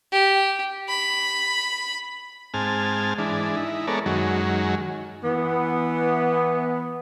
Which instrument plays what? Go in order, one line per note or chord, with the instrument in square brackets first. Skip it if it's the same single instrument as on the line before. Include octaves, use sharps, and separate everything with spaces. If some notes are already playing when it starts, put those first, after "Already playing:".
[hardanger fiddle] G4
B5
[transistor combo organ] G#2 C4 G#5 A5 F6
E3 G#3 D4
D#4 E4
G#3 B3 A4 A#4 C#5 D5
F#2 D#3 F#3 G#3
[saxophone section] E3 B3